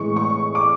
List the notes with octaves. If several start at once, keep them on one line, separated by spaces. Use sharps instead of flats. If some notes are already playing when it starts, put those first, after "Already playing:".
Already playing: A2 E3 G#3 C#6
C#6
D6